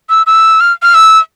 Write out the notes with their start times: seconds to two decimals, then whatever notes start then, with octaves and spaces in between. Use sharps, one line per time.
0.10 E6
0.27 E6
0.60 F6
0.83 F6
0.94 E6